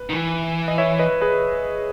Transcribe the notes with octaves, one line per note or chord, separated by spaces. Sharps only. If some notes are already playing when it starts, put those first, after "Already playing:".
Already playing: B4
D#3
E3
D#5
C#5 E5
B4 D#5
G#4 B4